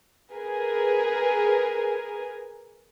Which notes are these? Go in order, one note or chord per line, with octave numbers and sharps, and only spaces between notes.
G#4 A#4 B4 G#5